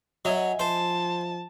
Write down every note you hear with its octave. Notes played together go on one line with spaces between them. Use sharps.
F#3 D#5 E5 G#5
F3 C5 A5